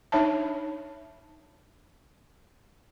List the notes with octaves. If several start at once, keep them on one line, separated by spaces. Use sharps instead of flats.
D4 D#4 C#5 E5 A5